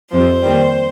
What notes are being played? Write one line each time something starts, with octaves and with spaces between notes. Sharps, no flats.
F2 C3 F3 C5
D#2 D#3 G3